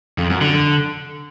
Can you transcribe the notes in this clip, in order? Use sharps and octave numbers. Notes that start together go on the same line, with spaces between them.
F2
F#2
D3